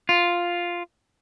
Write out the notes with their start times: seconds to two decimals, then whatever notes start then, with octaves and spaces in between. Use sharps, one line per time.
0.09 F4